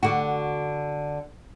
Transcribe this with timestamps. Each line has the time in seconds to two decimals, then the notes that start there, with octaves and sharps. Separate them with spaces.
0.03 D3 F#4